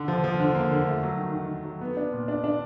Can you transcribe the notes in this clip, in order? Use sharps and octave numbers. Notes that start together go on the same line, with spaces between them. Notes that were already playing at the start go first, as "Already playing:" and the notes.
Already playing: D3
F3
F3
D3
A#3
D3
A3
F#3
D#3
D#3
D#3
F#3
B3
D4
A#2
D4
D4